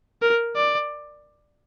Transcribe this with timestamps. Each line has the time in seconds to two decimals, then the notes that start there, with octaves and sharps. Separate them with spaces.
0.22 A#4
0.56 D5